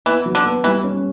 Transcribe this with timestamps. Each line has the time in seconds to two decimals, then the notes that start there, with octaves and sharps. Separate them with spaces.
0.06 E3 B3
0.26 F#3
0.35 D3
0.45 B3
0.64 E3 G3
0.84 C#4